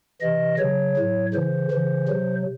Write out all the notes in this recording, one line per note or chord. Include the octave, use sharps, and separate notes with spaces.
C3 E3 D#5
C#3 F#3 C#5
A2 F#3
C#3 E3 C5
C#3 E3
C3 F#3